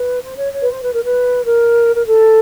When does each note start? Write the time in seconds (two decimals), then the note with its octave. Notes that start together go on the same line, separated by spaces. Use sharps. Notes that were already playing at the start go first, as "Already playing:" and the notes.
Already playing: B4
0.22 C5
0.38 C#5
0.52 C#5
0.61 B4
0.68 C5
0.83 B4
0.94 A#4
1.04 B4
1.45 A#4
1.94 A#4
2.06 A4